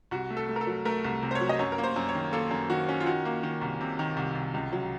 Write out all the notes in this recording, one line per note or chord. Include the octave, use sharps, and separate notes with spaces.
C2 F#4
A3
A4
A3
A#4
A4
F#3
A3 A#4
C2
C3
C5
C#5
F#3
D#5
F#2 C#5
A#4
A#3
C5
F#2
C#5
D#3
A#3 A4
F#2
D#3 F#4
C#4
F4
D#3 F#4
A#3
D#3
C2
C3
D#3
C2
C2
C#2
F#3